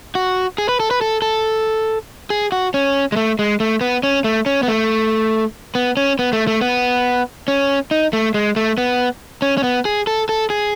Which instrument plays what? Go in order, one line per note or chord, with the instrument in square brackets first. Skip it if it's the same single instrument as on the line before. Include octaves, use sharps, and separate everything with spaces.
[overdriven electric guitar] F#4
G#4
B4
A4
B4
A4
A4
G#4
F#4
C#4
G#3
A3
G#3
A3
B3
C#4
A3
C#4
B3
A3
B3
C#4
B3
A3
A3
B3
C#4
D#4
A3
G#3
A3
B3
C#4
C#4
B3
G#4
A4
A4
G#4